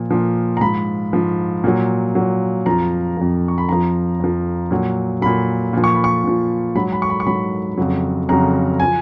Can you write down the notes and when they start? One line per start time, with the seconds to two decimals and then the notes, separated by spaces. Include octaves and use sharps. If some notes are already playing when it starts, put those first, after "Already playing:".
Already playing: A#2 F3
0.11 A#2 F3
0.57 A#5
0.61 G#2 F3 B5
1.13 G#2 F3
1.64 A#2 F#3
2.15 A#2 F#3
2.66 F2 F3 A#5
3.17 F2 F3
3.48 C#6
3.58 B5
3.69 F2 F3 A#5
4.20 F2 F3
4.71 A#2 F#3
5.22 A#2 F#3 B5
5.73 A#2 F3
5.84 C#6
5.95 B5
6.04 C#6
6.24 A#2 F3
6.75 G#2 F#3 B5
6.92 B5
7.02 C#6
7.10 B5
7.20 C#6
7.26 G#2 F#3 B5
7.77 F2 C#3 F#3
8.29 F2 C#3 F#3 A#5
8.80 F3 G#5